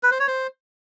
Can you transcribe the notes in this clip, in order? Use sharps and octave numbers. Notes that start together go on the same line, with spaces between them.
B4
C5
C#5
C5